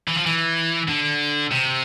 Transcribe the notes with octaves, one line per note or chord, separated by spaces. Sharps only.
E3
F3
E3
D3
C3